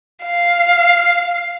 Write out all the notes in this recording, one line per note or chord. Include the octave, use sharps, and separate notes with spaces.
F5